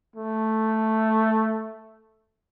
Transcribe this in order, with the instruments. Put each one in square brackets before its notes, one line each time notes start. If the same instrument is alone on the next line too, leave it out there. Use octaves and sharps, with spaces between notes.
[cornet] A3